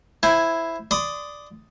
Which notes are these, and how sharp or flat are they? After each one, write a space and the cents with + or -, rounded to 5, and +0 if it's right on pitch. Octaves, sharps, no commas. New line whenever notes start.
E4 +0 C5 -5 G#5 +0
D5 +0 C6 -35 D#6 +0